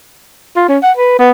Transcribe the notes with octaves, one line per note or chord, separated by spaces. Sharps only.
F4
C#4
F#5
B4
B3